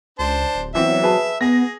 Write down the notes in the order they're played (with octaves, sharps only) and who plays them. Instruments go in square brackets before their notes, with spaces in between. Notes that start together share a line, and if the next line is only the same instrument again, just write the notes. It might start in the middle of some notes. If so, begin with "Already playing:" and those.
[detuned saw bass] C#2 [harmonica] D4 C5 A5
[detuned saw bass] D1
[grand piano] E3 B3 C4 [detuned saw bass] F#3 [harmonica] E5
[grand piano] G#4 B4 A5
[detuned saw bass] B3 [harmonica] G#4 [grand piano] A#6